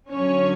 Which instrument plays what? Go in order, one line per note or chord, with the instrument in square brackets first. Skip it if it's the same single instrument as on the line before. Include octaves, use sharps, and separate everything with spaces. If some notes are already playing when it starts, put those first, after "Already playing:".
[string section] F#2 D3 F#3 C#4 C#5